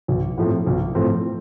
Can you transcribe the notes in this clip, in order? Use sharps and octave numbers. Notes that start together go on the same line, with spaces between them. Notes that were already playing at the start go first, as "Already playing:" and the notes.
B1
A2 F3 A3 C4
B1
A2 F3 A3 C4